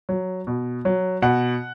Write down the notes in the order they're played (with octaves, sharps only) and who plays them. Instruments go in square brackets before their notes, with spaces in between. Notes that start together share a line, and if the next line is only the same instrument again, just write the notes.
[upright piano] F#3
B2
F#3
B2 F#5